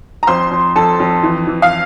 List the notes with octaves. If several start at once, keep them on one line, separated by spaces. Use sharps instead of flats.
A#5
F2 C5 C6
F2
F2 A4 A5
F2
E3
E3
F5